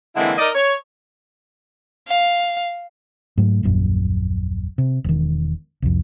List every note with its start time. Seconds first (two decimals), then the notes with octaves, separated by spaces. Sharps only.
0.16 D3 E3 G#3 A#3 C4 E4
0.38 D#4 A#4 D5 D#5
0.55 C#5
2.08 F5
3.38 G#2 F#3 A3
3.63 D#1 A#1 F#2
4.78 C3
5.04 E1 D#3
5.82 C2 F2